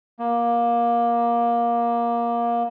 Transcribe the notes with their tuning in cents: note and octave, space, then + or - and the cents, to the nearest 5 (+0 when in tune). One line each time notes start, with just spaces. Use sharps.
A#3 +15